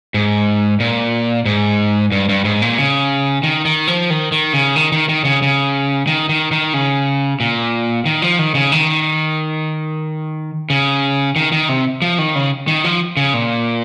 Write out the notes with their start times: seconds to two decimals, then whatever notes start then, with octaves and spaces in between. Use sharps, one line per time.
0.14 G#2
0.80 A#2
1.45 G#2
2.12 G2
2.29 G2
2.44 G#2
2.62 A#2
2.78 C#3
3.43 D#3
3.65 D#3
3.88 F3
4.10 D#3
4.32 D#3
4.53 C#3
4.76 D#3
4.92 D#3
5.09 D#3
5.25 C#3
5.42 C#3
6.07 D#3
6.29 D#3
6.52 D#3
6.74 C#3
7.40 A#2
8.06 D#3
8.22 F3
8.39 D#3
8.55 C#3
8.72 D#3
10.70 C#3
11.36 D#3
11.52 D#3
11.69 C3
12.02 F3
12.19 D#3
12.35 C#3
12.68 D#3
12.84 F3
13.17 C#3
13.34 A#2